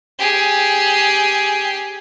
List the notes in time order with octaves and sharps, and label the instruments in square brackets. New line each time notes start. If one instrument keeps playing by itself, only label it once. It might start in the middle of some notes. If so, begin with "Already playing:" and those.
[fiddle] G4 G#4